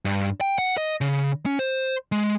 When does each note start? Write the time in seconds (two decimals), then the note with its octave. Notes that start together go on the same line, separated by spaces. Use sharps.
0.05 G2
0.41 G5
0.58 F#5
0.77 D#5
1.01 C#3
1.46 C#4
1.59 C5
2.12 G#3